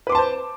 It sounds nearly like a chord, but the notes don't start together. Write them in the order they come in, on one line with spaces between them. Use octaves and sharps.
B4 D6 C6 A5 C5